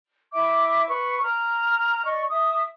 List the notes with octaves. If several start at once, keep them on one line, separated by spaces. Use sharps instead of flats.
E4 E5 D6
B4 C#6
A#5 F6
D5 D#5 C#6
E5 D#6